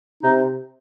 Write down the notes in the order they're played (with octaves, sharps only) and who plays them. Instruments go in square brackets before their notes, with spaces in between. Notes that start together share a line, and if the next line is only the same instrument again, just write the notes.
[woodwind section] C3 D#4